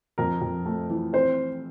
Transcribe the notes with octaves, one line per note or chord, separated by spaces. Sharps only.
F2 A#4
F2
A3
E3
C4 C5